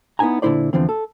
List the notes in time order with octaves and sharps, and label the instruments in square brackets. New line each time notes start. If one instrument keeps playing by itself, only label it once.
[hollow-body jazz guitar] B3 D#4 E4 G#5 A#5
A#2 D3 A#3 E4 C5 D5
E2 D3 E3 F3 C4
A4